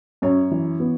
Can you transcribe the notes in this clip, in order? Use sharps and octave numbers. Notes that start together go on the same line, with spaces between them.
F#2 C#5
E3
B3